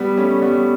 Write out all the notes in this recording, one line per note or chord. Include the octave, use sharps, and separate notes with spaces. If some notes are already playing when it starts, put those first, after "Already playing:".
Already playing: G3 B3
A3 C#4
G3 B3